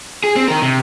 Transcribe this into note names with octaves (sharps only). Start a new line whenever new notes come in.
G#4
C4
D#3 A#4
C3